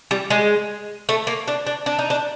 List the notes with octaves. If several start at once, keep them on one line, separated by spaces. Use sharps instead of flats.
G3
G#3
A3
A#3
D4
D4
D4
D#4
D4